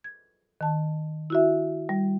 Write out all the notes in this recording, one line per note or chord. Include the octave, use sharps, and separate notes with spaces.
G#6
D#3 A5
E4 F#4 E5
G3